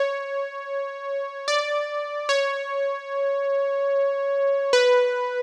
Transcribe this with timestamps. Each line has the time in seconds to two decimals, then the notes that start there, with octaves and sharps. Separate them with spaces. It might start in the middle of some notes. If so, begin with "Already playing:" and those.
Already playing: C#5
1.48 D5
2.29 C#5
4.73 B4